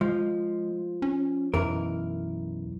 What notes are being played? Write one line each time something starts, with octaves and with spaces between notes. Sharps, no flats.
F3 G#3
C#4
B1 F#2 E3 A#4